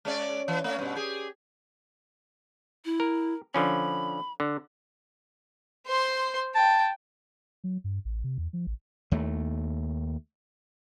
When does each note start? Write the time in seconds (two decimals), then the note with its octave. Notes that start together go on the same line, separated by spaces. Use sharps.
0.05 G#3 C#4 D5
0.48 E3
0.64 A3 C#4
0.79 G2 B2
0.95 G4 G#4
2.85 E4
3.00 A#4
3.54 D3 F3 C#4 B5
4.40 D3
5.87 C5 C6
6.55 G5 A5
7.64 F#3
7.84 G2
8.05 A1
8.24 C3
8.38 E2
8.53 F3
8.67 A1
9.11 D#2 A3